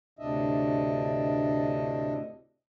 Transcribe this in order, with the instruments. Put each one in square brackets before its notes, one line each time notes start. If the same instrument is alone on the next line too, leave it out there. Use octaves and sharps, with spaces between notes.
[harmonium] D2 A2 C3 D4 D#5 E5